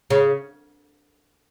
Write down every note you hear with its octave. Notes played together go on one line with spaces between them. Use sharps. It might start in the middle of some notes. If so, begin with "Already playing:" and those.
C#3